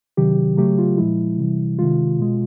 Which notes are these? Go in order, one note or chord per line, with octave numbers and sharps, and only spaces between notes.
C3 D#3 F#3 G4
C#3 F#3 A3 G4
F4
A#2 F3 G#3 E4
C3 E3 G3
C3 D#3 G#3 F4
B2 G#3